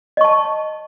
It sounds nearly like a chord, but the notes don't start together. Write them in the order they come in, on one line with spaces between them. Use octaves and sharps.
D#5 C#6 A5